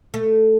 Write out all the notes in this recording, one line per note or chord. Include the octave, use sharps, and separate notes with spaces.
A3